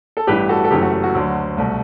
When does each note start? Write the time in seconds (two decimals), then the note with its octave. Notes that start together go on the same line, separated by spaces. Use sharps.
0.17 A4
0.27 A1 G2 E3 G4 B4
0.49 F#4 A4
0.64 A4
0.71 F#1 F#2 E3 A3 G4
0.82 F#4
0.93 F#4
1.04 F#4
1.15 D2 D3 F#3
1.57 C2 B2 A3